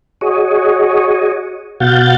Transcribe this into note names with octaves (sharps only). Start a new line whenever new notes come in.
F#4 G#4 C#5 D#5
B2 F#4 F5 F#5 G6 A6